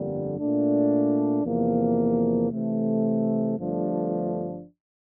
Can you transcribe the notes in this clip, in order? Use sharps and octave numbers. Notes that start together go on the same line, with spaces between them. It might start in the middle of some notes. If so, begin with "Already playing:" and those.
Already playing: G1 F2 D3 G3 A#3
A#2 A3 D4
E2 C3 F3 A#3
C3 E3 A3
G1 G2 F3 A3 D4